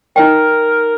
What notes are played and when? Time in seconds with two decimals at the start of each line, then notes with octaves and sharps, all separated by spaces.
0.16 D#4 A#4 D#5 G5